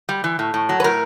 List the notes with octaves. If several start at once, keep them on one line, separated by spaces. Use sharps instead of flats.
G3
E3
A2
A2
F#3
B4
A2 A#4